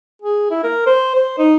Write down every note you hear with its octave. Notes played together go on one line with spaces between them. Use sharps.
G#4
E4
A#4
C5
C5
D#4